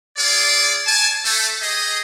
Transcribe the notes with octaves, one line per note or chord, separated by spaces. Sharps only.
F4 G#4 D5
G#5 A5
A3 A4
G4 G#4 D#5